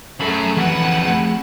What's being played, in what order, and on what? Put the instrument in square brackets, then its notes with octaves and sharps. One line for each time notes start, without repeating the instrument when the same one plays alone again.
[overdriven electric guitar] F#2 [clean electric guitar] F#3 B5 [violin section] A3 G#4
[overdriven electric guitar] F2 B4 [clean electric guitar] E3 G4 [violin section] F#5
[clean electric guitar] A3 C4 G#4